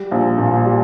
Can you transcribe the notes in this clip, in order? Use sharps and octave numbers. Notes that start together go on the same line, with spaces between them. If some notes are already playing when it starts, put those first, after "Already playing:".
Already playing: G3
A#1
A#2
G3